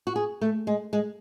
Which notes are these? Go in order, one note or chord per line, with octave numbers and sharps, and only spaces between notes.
F#4
G#4
A3
G#3
G#3